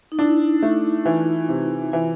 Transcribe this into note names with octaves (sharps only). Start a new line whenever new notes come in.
D#4
D4 E4
A3
E3 F4
C3
E3 F4